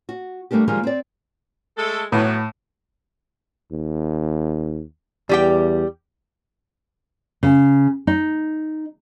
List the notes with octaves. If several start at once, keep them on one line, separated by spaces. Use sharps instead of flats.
F#4
G3 A3 A#3 D4 G4
D#3 F3 G3 G#3 A#3 D#4
C4 D5
G#3 A3 A4
A2 E3 F#3 B3
D#2
E2 G3 G4 G5
C#3
D#4